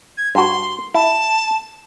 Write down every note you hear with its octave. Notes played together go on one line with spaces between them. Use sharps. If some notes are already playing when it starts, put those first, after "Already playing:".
G#6
G2 F#4 C6
E4 A5